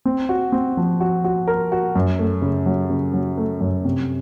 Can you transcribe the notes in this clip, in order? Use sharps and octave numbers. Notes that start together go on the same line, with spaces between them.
C4
F#4
C4
F3
F#4
F#4
A#4
F#4
F#2
A3
C#3
F#3
C#3
F#3
A3
F#2
C3